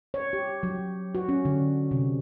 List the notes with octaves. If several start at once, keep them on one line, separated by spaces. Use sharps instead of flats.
C#5
G4
F#3
F#4
C#4
D3
C3